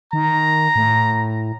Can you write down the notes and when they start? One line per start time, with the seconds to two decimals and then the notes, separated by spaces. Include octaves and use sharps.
0.13 D#3 A#5
0.76 A2